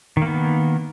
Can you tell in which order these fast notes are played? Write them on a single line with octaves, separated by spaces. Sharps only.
D#3 A#3 B3